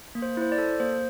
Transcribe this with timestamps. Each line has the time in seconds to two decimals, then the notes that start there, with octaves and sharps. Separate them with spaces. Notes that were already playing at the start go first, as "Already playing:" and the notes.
0.15 A#3
0.22 C5
0.37 E4 C5
0.52 D5
0.58 A4
0.80 A#3 C5